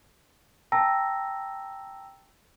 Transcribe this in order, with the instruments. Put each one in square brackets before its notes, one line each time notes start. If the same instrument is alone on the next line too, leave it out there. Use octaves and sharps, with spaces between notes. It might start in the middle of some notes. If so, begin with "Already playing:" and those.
[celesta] G5 A5 A#5 E6 A#6